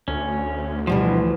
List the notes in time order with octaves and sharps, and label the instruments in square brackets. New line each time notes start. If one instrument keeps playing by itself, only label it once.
[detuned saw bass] D2 [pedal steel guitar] C#4
[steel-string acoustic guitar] G2 B2 G3 [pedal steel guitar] E3 F3